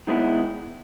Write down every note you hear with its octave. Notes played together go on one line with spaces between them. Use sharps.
D#3 G#3 B3 E4